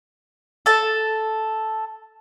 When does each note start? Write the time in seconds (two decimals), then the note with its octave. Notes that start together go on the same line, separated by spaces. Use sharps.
0.66 A4 A5